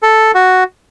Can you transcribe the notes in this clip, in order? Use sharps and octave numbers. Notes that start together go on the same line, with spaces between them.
A4
F#4